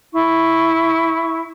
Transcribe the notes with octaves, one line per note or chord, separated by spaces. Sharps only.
E4 C#6